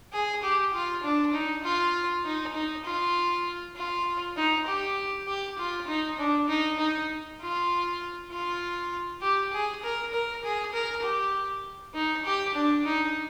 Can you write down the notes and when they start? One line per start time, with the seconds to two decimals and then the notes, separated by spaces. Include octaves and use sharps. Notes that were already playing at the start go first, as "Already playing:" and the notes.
0.13 G#4
0.42 G4
0.73 F4
1.03 D4
1.34 D#4
1.64 F4
2.25 D#4
2.54 D#4
2.85 F4
3.76 F4
4.36 D#4
4.66 G4
5.27 G4
5.58 F4
5.88 D#4
6.18 D4
6.48 D#4
6.79 D#4
7.40 F4
8.31 F4
9.21 G4
9.53 G#4
9.82 A#4
10.13 A#4
10.43 G#4
10.73 A#4
11.03 G4
11.94 D#4
12.25 G4
12.55 D4
12.85 D#4